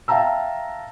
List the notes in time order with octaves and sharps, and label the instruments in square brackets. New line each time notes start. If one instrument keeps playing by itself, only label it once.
[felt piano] E5 F5 G5 A5 A#5 E6